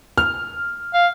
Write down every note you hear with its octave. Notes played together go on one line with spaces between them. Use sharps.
F6
F5